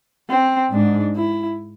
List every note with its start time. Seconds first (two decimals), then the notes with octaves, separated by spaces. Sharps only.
0.29 C4
0.72 G#2 D4
1.16 E4